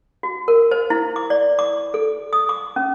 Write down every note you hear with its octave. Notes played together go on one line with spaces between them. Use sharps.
F#4
A#4
C5
E4
D6
D5
D6
A4
D#6
D6
C#4